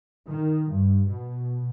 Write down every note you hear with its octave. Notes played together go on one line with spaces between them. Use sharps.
D#3
G2
B2